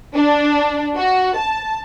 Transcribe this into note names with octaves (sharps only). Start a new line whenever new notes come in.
D4
F#4
A5